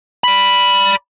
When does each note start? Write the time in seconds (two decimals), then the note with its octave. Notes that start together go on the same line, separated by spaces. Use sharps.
0.24 D5 B5